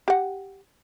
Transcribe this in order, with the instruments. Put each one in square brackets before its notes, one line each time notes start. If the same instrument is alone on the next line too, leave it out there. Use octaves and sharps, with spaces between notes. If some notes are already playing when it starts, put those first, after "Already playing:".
[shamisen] G4 F#5